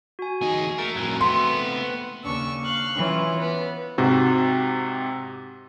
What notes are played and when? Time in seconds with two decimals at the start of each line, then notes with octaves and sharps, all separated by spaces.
0.19 F#4 G#5
0.41 E2 D#4 G#4
0.78 A3 A#4
0.96 F2 A2 F#3 A#4
1.21 A3 B3 C4 C6
2.24 D#2 C#3 C#4 D4 C#6 E6
2.64 F5 C#6 F#6
2.95 E3 C#4 F4
3.39 B3
3.98 G#2 C3 F#4